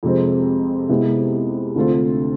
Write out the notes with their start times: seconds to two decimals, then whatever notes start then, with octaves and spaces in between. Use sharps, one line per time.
0.03 F2 C3 G#3 C4
0.89 C3 G#3 B3 E4
1.75 D2 D3 A3 C4 F4